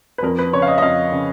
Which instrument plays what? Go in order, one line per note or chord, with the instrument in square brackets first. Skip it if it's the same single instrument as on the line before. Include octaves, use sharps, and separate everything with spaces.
[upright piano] B4
F2 A#4
B4
C#3 C#5
F5
D#5
D#5
F2 F5
C#3